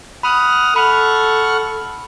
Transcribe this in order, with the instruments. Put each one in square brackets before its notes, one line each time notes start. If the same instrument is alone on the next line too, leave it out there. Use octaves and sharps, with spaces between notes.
[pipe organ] F#5 D#6 F6 [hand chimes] B5
[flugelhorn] A4 [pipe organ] F#5 C#6 F6 [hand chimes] B5